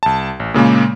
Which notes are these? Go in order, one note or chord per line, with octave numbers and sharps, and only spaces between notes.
C2 A5
A1
A#2 C#3 G#3 A#3